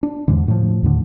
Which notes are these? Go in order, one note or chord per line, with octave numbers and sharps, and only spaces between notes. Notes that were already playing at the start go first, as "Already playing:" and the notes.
D4
E2 G#2 D3
A2 F3
D#2 A2 D3